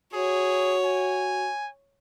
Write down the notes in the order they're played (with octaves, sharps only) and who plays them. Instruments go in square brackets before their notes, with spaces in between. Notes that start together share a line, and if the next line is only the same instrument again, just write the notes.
[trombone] F#4 [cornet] G#4 [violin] C#5
[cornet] G#5